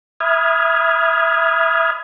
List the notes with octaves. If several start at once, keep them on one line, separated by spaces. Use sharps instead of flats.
E5 B5 D#6 F6 G#6